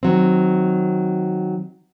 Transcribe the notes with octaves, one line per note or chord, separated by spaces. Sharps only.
D#3 F#3 C4